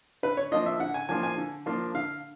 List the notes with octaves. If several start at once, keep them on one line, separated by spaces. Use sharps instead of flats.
D3 B4
C#5
F3 A#3 D4 F4 D#5
E5
D3 F#5
G#5
F3 A#3 D4 F4 G#5
G#5
D3
F3 A#3 D4 F4
D3 F5